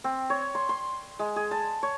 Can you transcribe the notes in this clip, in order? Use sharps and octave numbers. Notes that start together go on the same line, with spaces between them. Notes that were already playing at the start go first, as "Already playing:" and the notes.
C4
C#5
C6
C6
G#3
G#4
A5
C#5